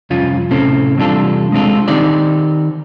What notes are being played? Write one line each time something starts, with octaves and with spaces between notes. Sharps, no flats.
C2 F2 C#4 F4
A2 C3 C4 C#4 A4
E2 C3 G3 D4 F4 A4
G#3 C4 D4 F4 A4
D#3 C4 D#4 G4 D5